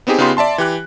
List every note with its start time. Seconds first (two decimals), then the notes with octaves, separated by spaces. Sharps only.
0.07 B3 C4 D#4 G4 G#4
0.18 C#3 B3 D#4 F4 G4 C6
0.37 D5 E5 A5 C6
0.58 E3 G4 F#6